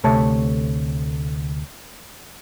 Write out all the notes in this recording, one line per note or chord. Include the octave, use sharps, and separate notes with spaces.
D2 C3 A3 C#5 A5